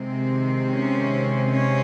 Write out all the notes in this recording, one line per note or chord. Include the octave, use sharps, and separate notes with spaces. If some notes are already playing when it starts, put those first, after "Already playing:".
Already playing: C3 D#3 G#3 C4
C#4
C#4